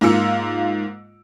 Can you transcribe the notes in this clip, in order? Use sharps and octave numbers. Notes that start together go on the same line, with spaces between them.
G#2 A#3 F4 E6 C#7